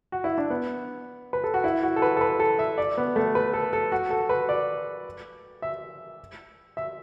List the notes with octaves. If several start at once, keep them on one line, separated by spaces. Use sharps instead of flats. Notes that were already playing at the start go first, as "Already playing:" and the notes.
F#4
E4
D4
B3
B4
A4
F#4
E4
F#4
A4
B4
A4
B4
A4
E5
D5
B3
A3
B4
A4
A4
F#4
A4
B4
D5
E5
E5